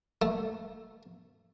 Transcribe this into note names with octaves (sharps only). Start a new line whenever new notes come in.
A3